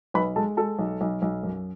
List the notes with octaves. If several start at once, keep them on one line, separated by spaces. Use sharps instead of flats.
B1 B4 B5
G#3 A4 A5
G#3 A4 A5
B1
B1
B1
F#2